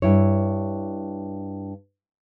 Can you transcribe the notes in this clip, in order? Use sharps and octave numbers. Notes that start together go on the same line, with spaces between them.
G2 E4 C#5